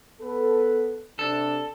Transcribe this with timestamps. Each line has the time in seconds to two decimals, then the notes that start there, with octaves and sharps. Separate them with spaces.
0.20 B3 A4 B4
1.19 C3 D4 A4